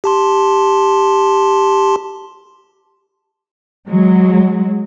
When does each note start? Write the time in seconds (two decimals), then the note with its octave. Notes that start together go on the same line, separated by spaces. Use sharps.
0.04 G4 A5 C6
3.88 F#3 G#3